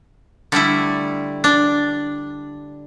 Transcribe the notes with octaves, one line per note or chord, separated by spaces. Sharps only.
D3 G3 A3 E4
D4